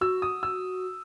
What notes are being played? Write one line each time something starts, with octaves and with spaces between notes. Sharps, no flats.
F#4 E6
D#6
E6